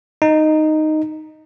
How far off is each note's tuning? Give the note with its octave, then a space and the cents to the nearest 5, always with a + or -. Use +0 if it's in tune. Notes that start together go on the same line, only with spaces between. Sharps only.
D#4 -5